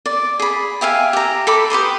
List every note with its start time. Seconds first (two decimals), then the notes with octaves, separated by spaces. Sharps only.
0.06 D5
0.39 G#4 B5
0.81 G4 E5 F5 G#5
1.13 G4 A#5
1.47 A4 B5 D6
1.70 G4 B4 C6 D#6